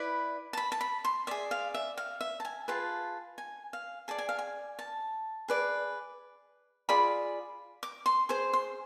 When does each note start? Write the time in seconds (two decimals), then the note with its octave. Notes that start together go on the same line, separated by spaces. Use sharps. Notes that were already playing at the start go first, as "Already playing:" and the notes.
Already playing: E4 B4 D5 B5
0.53 A5
0.57 B5
0.72 A5
0.81 B5
1.05 C6
1.27 G#4 D5 E5
1.51 F5
1.74 E5
1.97 F5
2.21 E5
2.40 A5
2.45 G#5
2.68 F4 G#4 B4 A5
3.38 G#5
3.73 F5
4.08 G#4 D5 A5
4.18 G#5
4.29 F5
4.39 G#5
4.79 A5
5.48 G#4 B4 D5
6.89 F4 G#4 D5 B5
7.83 D6
8.06 C6
8.29 G#4 C5 C6
8.53 C6